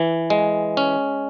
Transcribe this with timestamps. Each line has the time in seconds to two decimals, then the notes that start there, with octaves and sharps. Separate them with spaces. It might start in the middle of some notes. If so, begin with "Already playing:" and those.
Already playing: E3
0.30 G#3
0.77 C#4